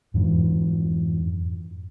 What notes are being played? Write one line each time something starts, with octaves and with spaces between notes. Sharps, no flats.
F2 G#2 E3